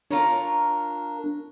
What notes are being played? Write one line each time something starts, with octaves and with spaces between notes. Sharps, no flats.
D4 F4 A#4 C#5